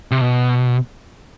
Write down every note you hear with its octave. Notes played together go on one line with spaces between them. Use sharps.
C3
B2